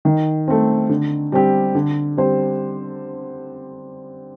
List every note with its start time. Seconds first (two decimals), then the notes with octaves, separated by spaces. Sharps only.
0.05 D#3
0.48 A3 C4
0.89 D3
1.32 G3 C4 G4
1.75 D3
2.17 G3 C4 C5